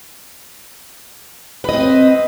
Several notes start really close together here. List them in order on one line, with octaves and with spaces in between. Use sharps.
B4 D#5 C4